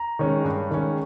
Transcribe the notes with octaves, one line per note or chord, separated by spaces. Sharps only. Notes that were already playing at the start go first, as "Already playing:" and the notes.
Already playing: A#5
D#3 G#3 C#4
G2
D#3 G#3 C#4